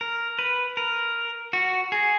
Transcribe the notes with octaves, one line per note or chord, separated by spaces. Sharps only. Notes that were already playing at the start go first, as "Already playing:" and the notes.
A#4
B4
A#4
F#4
G#4